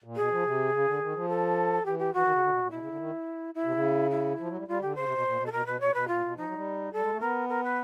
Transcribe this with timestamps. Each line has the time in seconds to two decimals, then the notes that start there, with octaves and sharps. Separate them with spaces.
0.04 A#2
0.16 B2 G#4
0.31 F3
0.45 C3
0.73 C#3
0.86 D3
1.01 D#3
1.15 F3
1.29 A4
1.86 E3 G4
1.99 G4
2.14 E3 F#4
2.23 D#3
2.32 C#3
2.42 D3
2.51 B2
2.61 A#2
2.71 B2 E4
2.80 C#3
2.89 D3
2.98 D#3
3.55 E4
3.65 C3
3.74 C#3
4.11 E4
4.40 F3
4.49 F#3
4.57 G3
4.68 G3 F4
4.82 D3 G4
4.95 C#3 C5
5.05 C3
5.15 B2
5.24 A#2
5.38 B2
5.46 A4
5.52 B2 A#4
5.66 B2 B4
5.80 B2 C#5
5.94 B2 B4
6.08 A#2 F4
6.22 B2
6.36 F3 D#4
6.46 F#3
6.55 G3
6.93 G3 A4
7.02 G#3
7.12 A3
7.21 B3 A#4
7.49 A#4
7.64 B4